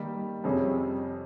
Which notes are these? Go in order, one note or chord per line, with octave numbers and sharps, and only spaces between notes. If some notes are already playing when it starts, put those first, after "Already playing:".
Already playing: D#3 G3 A#3
F2 C3 G3 C#4 G#4